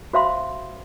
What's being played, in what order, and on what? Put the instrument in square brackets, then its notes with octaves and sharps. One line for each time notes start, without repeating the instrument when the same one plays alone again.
[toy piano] F#4 C5 E5 F5 B5 C6